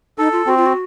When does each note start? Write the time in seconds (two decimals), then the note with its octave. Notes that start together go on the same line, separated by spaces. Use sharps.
0.18 D#4 A4
0.32 F4
0.46 C4 F#4
0.57 F4
0.66 F#4